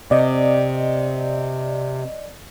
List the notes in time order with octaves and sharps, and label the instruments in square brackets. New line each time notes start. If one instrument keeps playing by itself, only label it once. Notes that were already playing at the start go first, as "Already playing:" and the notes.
[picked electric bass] C3 [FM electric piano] D5 D#5